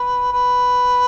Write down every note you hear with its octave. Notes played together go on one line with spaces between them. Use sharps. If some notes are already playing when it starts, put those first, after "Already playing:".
Already playing: B4
B4